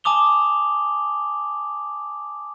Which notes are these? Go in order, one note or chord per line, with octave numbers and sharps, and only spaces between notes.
G#5 A5 D6 D#6 F7 G7